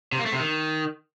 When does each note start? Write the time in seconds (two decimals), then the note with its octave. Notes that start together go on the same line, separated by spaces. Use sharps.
0.12 C3
0.19 A#3
0.26 A3
0.32 C3
0.39 D#3